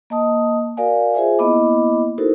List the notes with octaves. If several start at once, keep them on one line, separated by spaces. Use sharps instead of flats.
A#3 D#5 A5 D#6
F#4 A#4 D5 F5 G#5
F4 G#4 C5 E5 G#5
A#3 B3 E4 D#5 B5 D6
D#4 E4 F#4 A4 A#4 C5